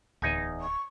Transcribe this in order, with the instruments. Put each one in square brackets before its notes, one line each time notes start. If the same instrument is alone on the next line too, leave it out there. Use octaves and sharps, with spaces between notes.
[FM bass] D1 [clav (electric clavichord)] E2 D#4 G#5
[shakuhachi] C#6